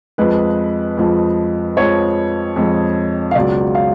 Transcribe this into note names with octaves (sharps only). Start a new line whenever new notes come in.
F2 F3 G#3 B4
F2 F3 G#3
F2 F3 G#3 C#5
F2 F3 G#3
F5
C#2 B2 F#3 D5
F5